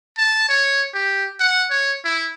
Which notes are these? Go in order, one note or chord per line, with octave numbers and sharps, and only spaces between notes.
A5
C#5
G4
F#5
C#5
E4